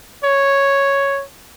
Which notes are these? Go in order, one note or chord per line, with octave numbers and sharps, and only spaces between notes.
C#5